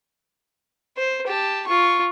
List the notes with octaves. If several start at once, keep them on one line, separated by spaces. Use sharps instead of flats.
C5
G4 A5
F4 C#6